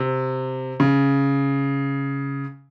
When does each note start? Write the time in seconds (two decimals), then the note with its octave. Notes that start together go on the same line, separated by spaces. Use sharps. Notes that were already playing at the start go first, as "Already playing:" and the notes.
Already playing: C3
0.80 C#3